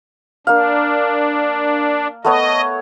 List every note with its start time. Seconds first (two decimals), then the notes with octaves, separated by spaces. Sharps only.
0.47 A#3 D4 F5
2.25 A3 B3 C#5 D#5